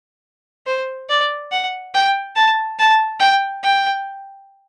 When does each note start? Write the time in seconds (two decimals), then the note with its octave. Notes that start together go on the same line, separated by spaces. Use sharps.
0.66 C5
1.09 D5
1.52 F#5
1.94 G5
2.35 A5
2.79 A5
3.20 G5
3.63 G5